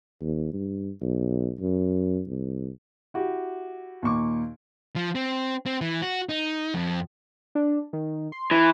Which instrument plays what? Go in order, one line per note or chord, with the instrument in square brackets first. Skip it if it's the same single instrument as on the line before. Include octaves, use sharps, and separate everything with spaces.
[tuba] D#2
G2
B1
F#2
C2
[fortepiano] E4 F#4 G4
D#2 A#2 C#6 D6
[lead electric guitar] F3
C4
C4
E3
F#4
D#4
F2
[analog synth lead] D4
D#3
C6
[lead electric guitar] E3